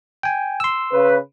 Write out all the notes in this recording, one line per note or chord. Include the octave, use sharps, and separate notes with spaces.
G5 G#5
C6 E6
C#3 B4